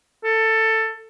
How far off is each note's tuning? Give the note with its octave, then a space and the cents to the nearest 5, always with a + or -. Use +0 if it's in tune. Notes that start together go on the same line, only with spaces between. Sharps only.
A4 +15